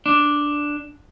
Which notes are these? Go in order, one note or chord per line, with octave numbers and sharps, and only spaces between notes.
D4